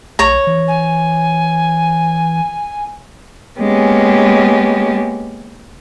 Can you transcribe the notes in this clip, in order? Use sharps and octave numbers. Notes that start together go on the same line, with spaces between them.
B1 C#5 A#5
E3
G#5
G#3 A#3 B3 C#4 G4